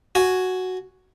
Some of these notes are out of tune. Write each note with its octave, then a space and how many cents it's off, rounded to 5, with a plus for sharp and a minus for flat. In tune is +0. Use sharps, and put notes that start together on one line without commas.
F#4 +0 G#5 +5